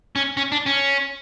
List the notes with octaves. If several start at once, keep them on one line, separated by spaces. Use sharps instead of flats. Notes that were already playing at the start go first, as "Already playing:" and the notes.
C#4
C#4
D4
C#4